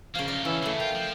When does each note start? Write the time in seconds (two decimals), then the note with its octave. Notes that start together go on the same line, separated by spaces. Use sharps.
0.15 C#3 F3 A#3 F5 F6
0.28 F#2 D#4 D5
0.45 E3 F#3 C#4 E4 A4
0.62 C#3 E3 F#3 A3
0.80 A#3 F4 G5
0.96 F3